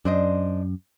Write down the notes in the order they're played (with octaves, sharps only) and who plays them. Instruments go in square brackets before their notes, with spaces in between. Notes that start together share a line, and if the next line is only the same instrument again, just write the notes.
[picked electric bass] F#2 [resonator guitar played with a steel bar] D4 C5 D#5